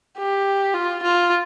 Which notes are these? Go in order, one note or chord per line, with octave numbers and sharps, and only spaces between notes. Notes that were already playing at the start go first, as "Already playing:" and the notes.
G4
F4
F4